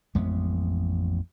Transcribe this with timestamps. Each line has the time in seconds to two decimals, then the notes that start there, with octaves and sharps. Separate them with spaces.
0.15 A1 F2 G#3 B3